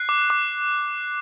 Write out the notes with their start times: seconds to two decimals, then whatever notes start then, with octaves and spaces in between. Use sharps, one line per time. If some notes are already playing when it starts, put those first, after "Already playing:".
Already playing: F#6 C7
0.09 D6
0.30 D6